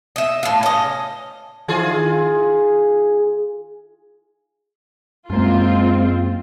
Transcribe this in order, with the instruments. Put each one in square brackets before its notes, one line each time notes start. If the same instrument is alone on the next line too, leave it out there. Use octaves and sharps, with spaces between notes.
[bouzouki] D#5 E5
A2 F5
C#4 D#5
[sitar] D#3 F4 G#4
[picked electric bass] F#2 A#3 [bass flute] G#3 [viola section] C4 F4